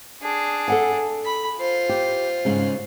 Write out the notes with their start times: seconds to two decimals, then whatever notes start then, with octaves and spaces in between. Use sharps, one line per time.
0.22 D4 G#4
0.68 A4 F#5 G#5
1.25 B5
1.57 F4 C5
1.89 G4
2.45 G#2 C#3 G#3